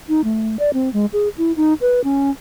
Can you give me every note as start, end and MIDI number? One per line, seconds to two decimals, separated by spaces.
0.09 0.21 63
0.24 0.56 57
0.59 0.70 74
0.74 0.92 60
0.93 1.06 56
1.13 1.28 68
1.38 1.52 64
1.57 1.74 63
1.81 2.03 71
2.04 2.30 61